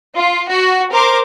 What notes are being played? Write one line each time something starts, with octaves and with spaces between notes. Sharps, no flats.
F4
F#4
A#4 C5 D6